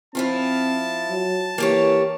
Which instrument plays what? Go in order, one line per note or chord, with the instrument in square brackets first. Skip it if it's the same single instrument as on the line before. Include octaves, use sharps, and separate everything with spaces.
[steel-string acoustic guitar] F3 E4 F4 [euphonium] C4 [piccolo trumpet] A5
[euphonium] F#3
[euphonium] E3 [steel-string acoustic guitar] A#3 G4 C#5